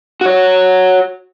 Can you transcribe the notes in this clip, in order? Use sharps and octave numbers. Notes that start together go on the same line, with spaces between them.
F#4 C#5